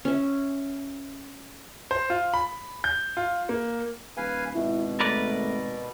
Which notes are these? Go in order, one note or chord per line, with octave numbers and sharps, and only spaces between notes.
C#4 E5
C5
F4
B5
G6
F4
A#3
D#1 B4 F5 G#5
G#1 B2 E4
A3 A#4 B4 D5